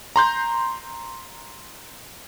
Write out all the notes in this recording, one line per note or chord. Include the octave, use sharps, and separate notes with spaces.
A#5 C6 G6